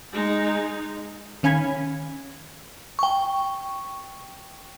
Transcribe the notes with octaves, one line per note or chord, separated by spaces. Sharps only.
G#3 D#4
D#3 C#4 F5 G#5 B5 G#6
G5 C#6